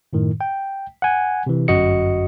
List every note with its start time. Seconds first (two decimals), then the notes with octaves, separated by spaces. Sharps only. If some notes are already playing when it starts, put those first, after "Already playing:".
0.13 F#2 A2 D#3
0.41 G5
1.02 F#5 G#5
1.46 C3 E3
1.68 G1 F#2 F#4 D#5 C#7